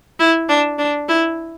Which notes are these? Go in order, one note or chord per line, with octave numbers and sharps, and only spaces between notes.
E4
D4
D4
E4